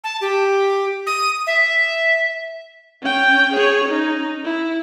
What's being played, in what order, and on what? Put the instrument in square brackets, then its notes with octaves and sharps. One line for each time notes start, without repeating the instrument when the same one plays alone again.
[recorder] A5
G4
D#6
E5
[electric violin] C#4 G5
G#4 C#5
C#4 D#4
E4